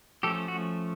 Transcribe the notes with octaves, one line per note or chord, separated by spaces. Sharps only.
F3 A3 C#4 G4 A4
F#4